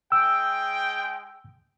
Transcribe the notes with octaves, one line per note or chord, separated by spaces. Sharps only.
G#3 G5 E6